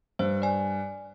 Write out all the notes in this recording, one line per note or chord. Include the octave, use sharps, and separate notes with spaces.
G2 C5
D5 G#5